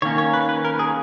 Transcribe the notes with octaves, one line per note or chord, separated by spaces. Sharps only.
D#3 A#3 C#4 C#5
C#5
B4
B4
A#4
G#4